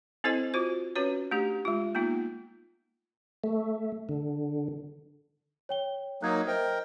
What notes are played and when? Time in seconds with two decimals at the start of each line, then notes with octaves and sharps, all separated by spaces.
0.24 C4 E4 A4 C5 D#5 G#5
0.54 F4 F#4 C5
0.96 C#4 F#4 B4 C#5
1.31 A3 D4 G4
1.65 G#3 F4
1.95 A#3 B3 D#4 F4
3.44 A3
4.09 D3
5.69 C#5 G5 G7
6.23 F#3 A#3 D#4 F#6 G#6
6.47 A#4 C5 D#5 E5 G5